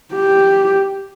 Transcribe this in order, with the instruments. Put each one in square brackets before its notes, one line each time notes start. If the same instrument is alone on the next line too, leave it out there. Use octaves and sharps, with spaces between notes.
[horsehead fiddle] G4